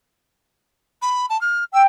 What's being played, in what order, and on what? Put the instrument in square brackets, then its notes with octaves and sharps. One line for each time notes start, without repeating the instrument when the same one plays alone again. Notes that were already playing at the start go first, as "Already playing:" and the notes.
[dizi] B5
A5
F6
[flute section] G5 [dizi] E6